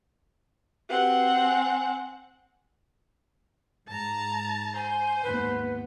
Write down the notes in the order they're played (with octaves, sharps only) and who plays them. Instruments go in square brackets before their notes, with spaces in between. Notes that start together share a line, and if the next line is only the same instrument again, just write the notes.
[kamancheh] C4 F#5 [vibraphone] F#4 G4 B4
[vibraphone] G#5
[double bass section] G#2 [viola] A5 A#5
[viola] C5 [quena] G#5
[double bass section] D#2 G#2 B3 [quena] B4